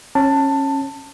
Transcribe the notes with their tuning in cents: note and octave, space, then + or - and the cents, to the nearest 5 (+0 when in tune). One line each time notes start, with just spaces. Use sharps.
C#4 -20 A5 +15